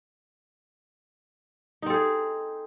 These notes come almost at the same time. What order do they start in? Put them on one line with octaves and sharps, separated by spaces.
D#4 C4 A4 G#4